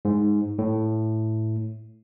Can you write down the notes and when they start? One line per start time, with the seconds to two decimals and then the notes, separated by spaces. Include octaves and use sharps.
0.05 G#2
0.59 A2